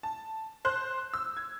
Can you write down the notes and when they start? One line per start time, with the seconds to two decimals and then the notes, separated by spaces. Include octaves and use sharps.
0.03 A5
0.65 C5 F#6 G6
1.14 E6
1.37 G#6